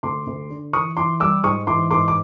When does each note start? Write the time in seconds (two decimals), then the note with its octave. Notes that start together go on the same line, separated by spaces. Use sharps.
0.03 D2 C6 D6
0.27 D2
0.50 D3
0.73 E3 C#6 D#6
0.97 E3 C6 D6
1.20 G3 D6 E6
1.44 G#2 C#6 D#6
1.67 E3 C6 D6
1.91 G#2 C6 D6
2.08 D6